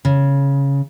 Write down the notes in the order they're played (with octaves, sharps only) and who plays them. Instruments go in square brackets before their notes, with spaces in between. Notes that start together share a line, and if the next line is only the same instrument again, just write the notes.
[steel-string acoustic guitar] C#3